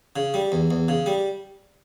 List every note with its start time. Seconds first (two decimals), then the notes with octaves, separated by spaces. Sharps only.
0.16 C#3
0.34 G3
0.52 E2
0.71 E2
0.88 C#3
1.06 G3